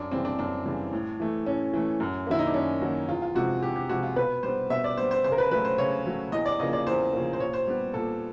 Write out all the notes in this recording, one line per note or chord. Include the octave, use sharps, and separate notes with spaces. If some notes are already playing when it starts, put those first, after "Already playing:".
Already playing: F#2 D4
C#3 E3 G3 C4
D4
F#2 D4
C#3 E3 G3
A2
E3 A3
A2 C#4
E3 A3
F#2
D#3 F#3 A#3 E4
D#4
D4
F#2 C#4
D#3 F#3 A#3
E2 F4
F4
C3 F3 G#3 F#4
E2 G4
G4
C3 F3 G#3 F#4
F4
B2 B4
G3 C5
B3
B2 E5
D5
G3 B3 C5
C5
C#3 C5
A#4
B4
F#3 A3 B4
C5
C#3 C#5
F#3 A3
E2 D#5
D5
C#3 F3 A#3 D#5
D5
E2 C5
C#3 F3 A#3
C5
A#2 C#5
C5
G3 B3
A#2 A4